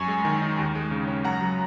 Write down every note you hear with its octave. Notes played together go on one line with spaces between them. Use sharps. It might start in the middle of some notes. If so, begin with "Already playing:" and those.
Already playing: F#2 G#5 C#6
G#3
D#3
D#4
D#2
G#3
C#3
C#4
F#2 F#5 A#5
F#3